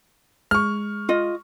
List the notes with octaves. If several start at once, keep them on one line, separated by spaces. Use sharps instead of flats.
G#3 C#6 F6
F4 D#5